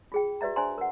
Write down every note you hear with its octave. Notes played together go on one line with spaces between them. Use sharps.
F4 G#4 G5
F#4 B4 D5 E5 A#5
D4 C5 D5 G#5 A#5 C6
A#4 F#5